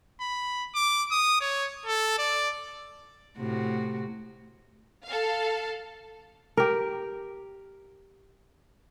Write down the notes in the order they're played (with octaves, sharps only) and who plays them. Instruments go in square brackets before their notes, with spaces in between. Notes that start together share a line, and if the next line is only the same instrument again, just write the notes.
[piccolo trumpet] B5
D6
D#6
C#5
A4
D5
[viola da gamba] A2 C3 F#4
[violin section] A4 F5
[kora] G4 A#4